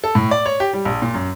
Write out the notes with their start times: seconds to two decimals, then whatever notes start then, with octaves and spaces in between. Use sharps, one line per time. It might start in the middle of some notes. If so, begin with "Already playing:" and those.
0.04 A4
0.15 A2
0.31 D5
0.46 C#5
0.60 G4
0.73 G3
0.85 A#1
1.02 A#2
1.14 F#2